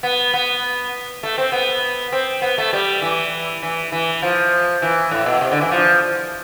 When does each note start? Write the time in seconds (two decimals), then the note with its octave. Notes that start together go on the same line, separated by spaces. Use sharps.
0.03 B3
0.34 B3
1.23 A3
1.38 C4
1.52 B3
2.12 C4
2.42 B3
2.58 A3
2.73 G3
3.02 E3
3.63 E3
3.92 E3
4.22 F3
4.82 E3
5.11 A2
5.26 B2
5.41 C3
5.51 D3
5.61 E3
5.71 F3